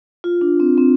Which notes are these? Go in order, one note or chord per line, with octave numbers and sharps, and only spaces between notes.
F4
D4
C4
C4